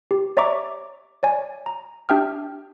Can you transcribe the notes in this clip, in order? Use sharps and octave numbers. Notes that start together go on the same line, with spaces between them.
G4
C#5 D5 E5 A#5 C#6 D6
C#5 D5 G#5
A#5
D4 G4 E5 G5 D#6 F6